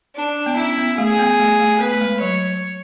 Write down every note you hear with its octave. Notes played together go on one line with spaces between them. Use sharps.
D4
B3
C#4 E4
B3
A3 G#4
B3
A3
A3
B3 B4
A3
G#3
F#3 C#5